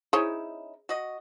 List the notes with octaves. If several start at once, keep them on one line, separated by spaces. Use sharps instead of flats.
C#4 D#4 E4 G#4 C5 C#5
F#4 D#5